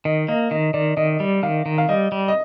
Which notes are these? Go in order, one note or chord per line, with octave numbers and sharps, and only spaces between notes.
D#3 D#5
A#3 D#5
D#3 D#5
D#3 D5
D#3 D#5
G3
D#3 F5
D#3
F5
G3 D#5
G3
D#5